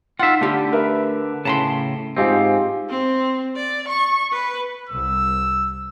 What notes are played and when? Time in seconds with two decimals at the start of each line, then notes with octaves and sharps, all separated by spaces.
0.19 D#4 F4 E5 F#5
0.41 D3 A3 G4
0.72 A#4 B4 E5
1.45 A2 C#3 A5 A#5 C6
2.17 G#2 C4 F4 G4 G#4
2.90 C4
3.56 D5
3.88 C#6
4.32 B4
4.89 C2 E6